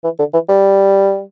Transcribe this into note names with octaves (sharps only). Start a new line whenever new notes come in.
E3
D3
E3
G3